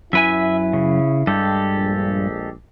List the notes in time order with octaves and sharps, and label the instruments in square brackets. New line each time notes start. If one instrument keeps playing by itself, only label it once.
[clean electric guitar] F#2 B4 G#5 [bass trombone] E4 [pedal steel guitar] E5
[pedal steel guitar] C#3
[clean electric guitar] G2 [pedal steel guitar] G#3 G4 A4
[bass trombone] A#1